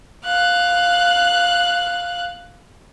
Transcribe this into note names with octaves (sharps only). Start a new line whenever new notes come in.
F5 F#6